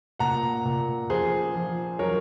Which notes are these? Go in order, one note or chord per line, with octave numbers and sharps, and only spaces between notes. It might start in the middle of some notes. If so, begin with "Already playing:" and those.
A#2 F#5 A#5
A#2
F3 G#4 C5
F3
F#3 A#4 C#5